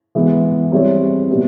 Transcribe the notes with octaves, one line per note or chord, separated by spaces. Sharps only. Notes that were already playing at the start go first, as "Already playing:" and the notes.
E3 G#3 B3
G3 C4 E4 G#4 C#5
A#2 G3 B3 E4